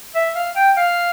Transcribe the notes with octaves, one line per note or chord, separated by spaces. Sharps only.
E5
F5
G5
F5